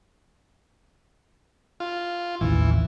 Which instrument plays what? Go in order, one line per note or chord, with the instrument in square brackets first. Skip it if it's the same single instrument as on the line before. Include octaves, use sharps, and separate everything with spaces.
[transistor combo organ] F4
[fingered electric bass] A1 D#2 [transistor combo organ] E3